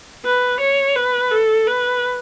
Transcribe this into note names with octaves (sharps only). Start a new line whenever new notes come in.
B4
C#5
B4
A4
B4